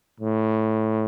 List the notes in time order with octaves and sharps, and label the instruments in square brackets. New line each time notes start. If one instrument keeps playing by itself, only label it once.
[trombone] A2